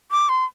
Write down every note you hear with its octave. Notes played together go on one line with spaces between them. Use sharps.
D6
C6